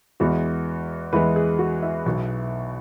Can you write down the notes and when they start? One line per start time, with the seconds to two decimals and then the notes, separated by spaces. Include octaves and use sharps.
0.20 E2 E3 G#3 B3 F#4
1.13 E2 E3 G#3 B3 B4
1.36 G#4
1.59 F#4
1.82 E4
2.06 B1 B2 B3